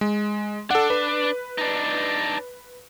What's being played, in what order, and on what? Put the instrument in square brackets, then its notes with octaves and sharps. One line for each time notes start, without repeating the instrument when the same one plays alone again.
[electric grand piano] G#3
[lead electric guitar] D4 [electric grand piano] A4 F#5
[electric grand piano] B4
[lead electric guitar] D4 D#4